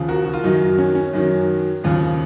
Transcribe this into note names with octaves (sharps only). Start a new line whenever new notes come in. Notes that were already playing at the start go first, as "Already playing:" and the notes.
Already playing: D#2 C#3 F3
F#4 A#4
F#4
F4
F#2 D#3 F#3 D#4
C#4
C#4
F#2 D#3 F#3
D#2 C#3 F3